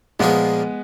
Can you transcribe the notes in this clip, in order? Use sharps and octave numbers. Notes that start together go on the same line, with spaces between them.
A#2 F3 G#3 A#3 B3 F4 G#4